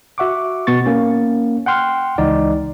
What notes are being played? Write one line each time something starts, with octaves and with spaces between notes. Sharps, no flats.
F#4 E5 F#5 C#6 D6
B2 B3 C#6 A6
A#3 C#4
F#5 G5 C6 F6
C#2 E3 D#4 D5